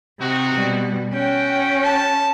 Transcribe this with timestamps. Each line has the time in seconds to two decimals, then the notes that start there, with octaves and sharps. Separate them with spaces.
0.19 C3 C4 D#4 F#4
0.54 B2 G3
1.13 C#4 F#4 G5
1.84 A5